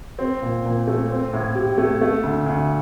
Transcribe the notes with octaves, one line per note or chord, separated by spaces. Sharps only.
C4
A#2
A#2
A3
C4
A2
G4
A3
A3
D2
D2